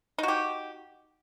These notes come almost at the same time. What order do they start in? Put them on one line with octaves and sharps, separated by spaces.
D#4 F#4 G4